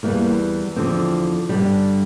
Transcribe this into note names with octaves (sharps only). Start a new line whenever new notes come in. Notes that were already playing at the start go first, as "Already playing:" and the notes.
E2 E3 G3 A#3
E2 D3 F3 C4
G2 D3 G3